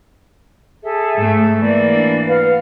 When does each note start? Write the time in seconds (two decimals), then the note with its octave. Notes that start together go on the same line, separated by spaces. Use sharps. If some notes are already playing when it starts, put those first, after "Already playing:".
0.83 G#4 A4 E5
1.16 G#2 A3
1.60 E3 A#3 D5 B5
1.95 D4
2.28 B4 F5 F#5